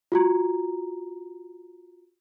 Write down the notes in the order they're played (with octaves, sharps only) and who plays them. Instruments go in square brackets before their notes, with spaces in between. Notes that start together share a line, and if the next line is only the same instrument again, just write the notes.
[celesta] F4 F#4 A#5